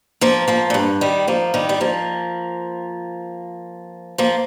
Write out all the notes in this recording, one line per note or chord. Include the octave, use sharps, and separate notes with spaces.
F3 A#3
F3 A#3
A#2
G2
D#3 G3
F3 A#3
D#3 G3
G3
F3 A#3
F3 A#3